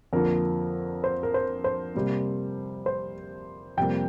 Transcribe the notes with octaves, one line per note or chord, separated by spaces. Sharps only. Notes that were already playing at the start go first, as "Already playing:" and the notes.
F2 D3 F3 A#3 A#4
C5
A#4
C5
C5
C3 G3 A#3
C5
F2 C3 G3 A#3 G5